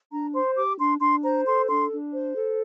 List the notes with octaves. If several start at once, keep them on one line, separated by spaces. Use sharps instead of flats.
D4 A#5
C5 C6
G4 D6
D4 C6
D4 C6
C5 A#5
A4 C6
D4 C6
D4
C5
A4